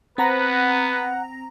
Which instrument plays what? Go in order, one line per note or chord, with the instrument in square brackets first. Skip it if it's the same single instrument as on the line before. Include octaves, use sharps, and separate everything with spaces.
[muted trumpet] B3 [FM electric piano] C4 A#5 A#6 [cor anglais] B4 [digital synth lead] F#5